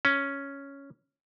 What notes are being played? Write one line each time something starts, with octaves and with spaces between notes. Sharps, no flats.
C#4